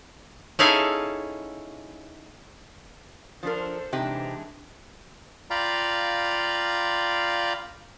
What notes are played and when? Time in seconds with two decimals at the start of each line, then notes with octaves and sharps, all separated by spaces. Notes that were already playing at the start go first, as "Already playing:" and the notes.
0.59 C#4 D#4 E4 G#4 A4 F5
3.43 F3 D4 A4 A#4 C5
3.93 C3 E3 G#3 D4 D#4 G4
5.50 F4 D5 F5 G5 A#5 B5